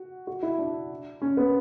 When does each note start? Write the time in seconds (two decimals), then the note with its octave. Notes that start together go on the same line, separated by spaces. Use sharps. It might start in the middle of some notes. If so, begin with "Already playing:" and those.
Already playing: F#4
0.27 F#4
0.43 E4
0.59 D4
1.22 C#4
1.37 B3